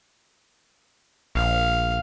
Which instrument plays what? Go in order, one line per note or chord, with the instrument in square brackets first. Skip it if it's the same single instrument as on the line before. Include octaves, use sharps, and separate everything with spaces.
[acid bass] A#1 [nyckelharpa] F5